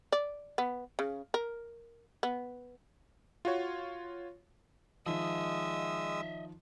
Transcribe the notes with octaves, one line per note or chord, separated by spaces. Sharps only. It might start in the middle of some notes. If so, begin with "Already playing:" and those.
D5
B3
C#3
A#4
B3
F4 F#4 C#5
D#3 F3 G#3 D#5 E5 D#6 E6